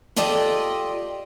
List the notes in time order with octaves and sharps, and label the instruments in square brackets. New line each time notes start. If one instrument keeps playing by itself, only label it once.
[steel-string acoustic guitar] F4 G4 A4 D5 D#5 G5